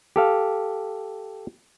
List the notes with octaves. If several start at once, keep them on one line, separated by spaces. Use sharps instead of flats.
G4 A4 F5